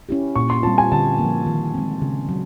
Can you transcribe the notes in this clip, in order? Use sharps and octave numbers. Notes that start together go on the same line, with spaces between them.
C#4 E4 G4
A#2 C#6
C6
G3 C4 F4 A5
G#5
D3 A5
F3 A#3
D#3
G#3 C4
C#3
F#3